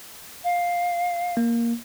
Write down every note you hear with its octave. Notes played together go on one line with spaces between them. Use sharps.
F5
A#3